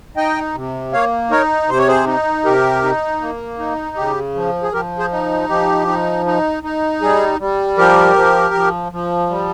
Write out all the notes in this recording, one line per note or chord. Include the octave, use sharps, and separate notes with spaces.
D#4 D#5 G5
C3
A#3 C#5 F5
D#4 A#4 C#5
C3 C5
C#5
G#4 C5
D#4
C3 G4 A#4
D#4
A#3
D#4
C#3 G4
F3
G#4
F3 G4 A#4
G#4 C5
D#4
F3 G4
D#4
D#4
D#4
G3 G#4
G3
F3 G4 A#4
F3
F3
F3
G3